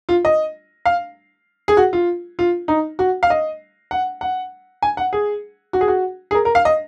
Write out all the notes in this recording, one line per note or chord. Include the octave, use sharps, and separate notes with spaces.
F4
D#5
F5
G#4
F#4
F4
F4
D#4
F#4
F5
D#5
F#5
F#5
G#5
F#5
G#4
F#4
G#4
F#4
G#4
A#4
A#4
F5
D#5